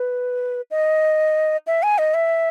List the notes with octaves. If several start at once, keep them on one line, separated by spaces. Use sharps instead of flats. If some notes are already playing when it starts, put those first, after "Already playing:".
Already playing: B4
D#5
E5
G#5
D#5
E5